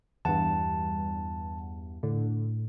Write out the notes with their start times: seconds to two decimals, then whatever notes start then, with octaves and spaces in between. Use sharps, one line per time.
0.25 E2 G2 F#5 A5
2.03 A2 D3